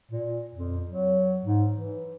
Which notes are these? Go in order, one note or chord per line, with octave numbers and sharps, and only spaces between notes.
A#2
F2
F#3
G#2
E3